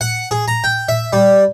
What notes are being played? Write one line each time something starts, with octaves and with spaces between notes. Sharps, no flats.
F#5
G#4
A#5
G5
E5
G3